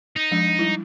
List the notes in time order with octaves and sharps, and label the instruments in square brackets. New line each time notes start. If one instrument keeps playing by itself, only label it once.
[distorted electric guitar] D#4
[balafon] F3 G#3 D4
G3 E4